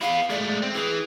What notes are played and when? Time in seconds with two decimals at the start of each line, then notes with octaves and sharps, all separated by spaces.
0.01 B3 E4 F5
0.30 G#3 A3 D5
0.62 C4
0.75 E3 G#4